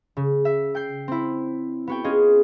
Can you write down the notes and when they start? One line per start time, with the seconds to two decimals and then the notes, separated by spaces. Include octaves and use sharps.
0.17 C#3
0.45 E5
0.75 G5 G6 C7
1.08 C4 E4
1.87 B3 F#4 G5
2.04 C#4 F4 G#4 D#5